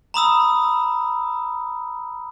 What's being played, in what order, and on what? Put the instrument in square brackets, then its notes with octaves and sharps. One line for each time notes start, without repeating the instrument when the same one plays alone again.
[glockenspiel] A#5 B5 D#6 E6